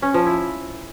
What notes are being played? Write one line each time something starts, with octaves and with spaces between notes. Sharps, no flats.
C#4
F3
E4